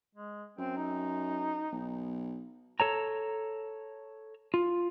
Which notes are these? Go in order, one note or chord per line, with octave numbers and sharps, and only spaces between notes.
G#3
F#2 C4
D#4
B1
A4 C#5 A#5
F4